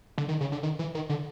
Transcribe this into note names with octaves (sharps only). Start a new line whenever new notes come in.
D3
D#3
C#3
D3
D#3
E3
D#3
D3